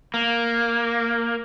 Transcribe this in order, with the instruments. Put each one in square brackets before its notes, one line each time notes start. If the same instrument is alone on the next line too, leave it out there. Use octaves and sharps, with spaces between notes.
[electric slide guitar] A#3